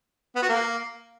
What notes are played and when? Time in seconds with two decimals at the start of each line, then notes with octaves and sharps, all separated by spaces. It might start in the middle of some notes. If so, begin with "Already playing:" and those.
0.36 B3
0.42 F#4
0.49 A#3